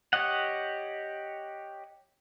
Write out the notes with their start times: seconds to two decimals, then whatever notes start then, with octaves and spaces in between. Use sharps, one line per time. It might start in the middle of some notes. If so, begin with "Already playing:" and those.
0.13 G4 C#5 D#5 F#5